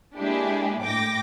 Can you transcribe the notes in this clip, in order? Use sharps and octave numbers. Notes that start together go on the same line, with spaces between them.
G#3 A#3 D4 E4 G4 G#4
A2 G5 D6 A#6